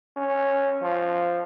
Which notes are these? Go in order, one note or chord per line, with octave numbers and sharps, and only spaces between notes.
C#4
F3